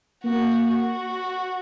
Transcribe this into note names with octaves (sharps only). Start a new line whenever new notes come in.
A#3 F#4
F#4